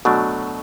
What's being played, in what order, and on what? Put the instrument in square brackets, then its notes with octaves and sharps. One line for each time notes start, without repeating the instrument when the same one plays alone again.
[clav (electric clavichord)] B2 F#3 A3 D4